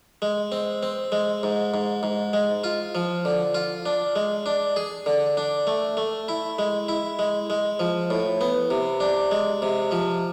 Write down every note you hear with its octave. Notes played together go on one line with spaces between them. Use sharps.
G#3
C4
C4
G#3
G#2
G#2
G#2
G#3
F4
F3
D3
F4
D4
G#3
D4
G#4
D3
D4
A3
A3
E4
G#3
E4
G#3
G#3
F3
A2
B3
C3
D4
G#3
C3
F3